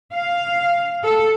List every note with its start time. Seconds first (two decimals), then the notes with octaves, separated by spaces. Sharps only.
0.13 F5
1.03 A4